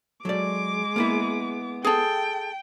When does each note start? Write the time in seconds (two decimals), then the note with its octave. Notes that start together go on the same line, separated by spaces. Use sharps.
0.25 F#3 G#3 A4 D5 D6
0.96 A#3 B3 E4
1.85 G#4 A4 G5